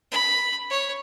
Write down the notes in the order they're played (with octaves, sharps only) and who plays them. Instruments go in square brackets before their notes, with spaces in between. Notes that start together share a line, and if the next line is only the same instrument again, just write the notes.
[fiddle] B5
C#5